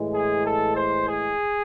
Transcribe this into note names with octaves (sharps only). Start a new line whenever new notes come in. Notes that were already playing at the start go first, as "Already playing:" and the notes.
Already playing: A2 E3 G#3
G#4
A4
C5
G#4